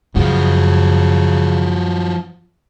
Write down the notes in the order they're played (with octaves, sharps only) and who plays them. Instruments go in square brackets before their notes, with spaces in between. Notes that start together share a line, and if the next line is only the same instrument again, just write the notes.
[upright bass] F#2 [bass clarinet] C#3 [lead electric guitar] F3 F#4